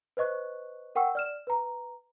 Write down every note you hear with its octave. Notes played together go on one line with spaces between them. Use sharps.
B4 C5 D#5 C#6 F#6
A#4 F#5 G5 C#6 E6
D5 F6 E7
B4 A#5